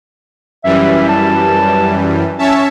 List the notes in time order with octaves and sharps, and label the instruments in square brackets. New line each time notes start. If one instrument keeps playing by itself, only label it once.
[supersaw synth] F#2 E3 G3 [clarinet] E5
[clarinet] A5
[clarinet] C#4 [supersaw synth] C#5 E5 A5